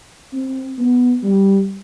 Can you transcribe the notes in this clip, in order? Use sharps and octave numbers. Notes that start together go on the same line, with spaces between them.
C4
B3
G3